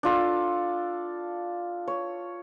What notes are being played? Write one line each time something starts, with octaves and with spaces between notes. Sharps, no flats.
D4 F4 A4
C#5